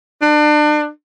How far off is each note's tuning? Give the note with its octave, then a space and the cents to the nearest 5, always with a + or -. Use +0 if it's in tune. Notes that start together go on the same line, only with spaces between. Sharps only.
D4 +35